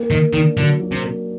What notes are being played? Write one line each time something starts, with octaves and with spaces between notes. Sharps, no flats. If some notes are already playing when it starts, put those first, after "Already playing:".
Already playing: A#3
D#3 A#3
D#3 D4
D3 F#3
F#3
C3
A#3